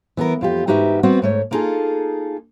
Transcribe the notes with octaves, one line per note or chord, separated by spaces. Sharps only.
E3 B3 G#4 A#4
F2 F4 G4
G#2 D#4 F#4 G4 B4 E5
G3 B3 C4 F#4 F#5
G#2 A3 C#5
A#3 B3 D#4 F4 G#4 A4